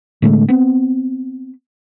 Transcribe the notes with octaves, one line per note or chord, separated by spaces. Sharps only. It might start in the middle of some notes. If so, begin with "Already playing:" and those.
A2 D3 G#3 A3
B3 C4